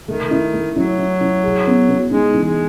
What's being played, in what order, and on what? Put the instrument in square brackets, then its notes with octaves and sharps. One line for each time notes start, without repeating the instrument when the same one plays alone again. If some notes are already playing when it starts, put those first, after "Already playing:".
[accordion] D#3 [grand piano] A3
[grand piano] E4
A3
[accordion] F#3 [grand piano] E4
[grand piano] E4
E4
G#4
B3
B3
[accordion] G#3 [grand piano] D#4
[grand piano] E3
[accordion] G#3